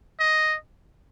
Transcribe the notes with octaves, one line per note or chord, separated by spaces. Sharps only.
D#5